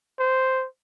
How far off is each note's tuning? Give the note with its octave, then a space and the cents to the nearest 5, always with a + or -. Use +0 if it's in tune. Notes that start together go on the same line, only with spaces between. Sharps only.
C5 -5